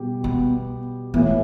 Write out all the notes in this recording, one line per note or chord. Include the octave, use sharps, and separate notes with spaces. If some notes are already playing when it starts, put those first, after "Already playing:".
Already playing: B2 G3 G4
B3
A2 E3 A3 B3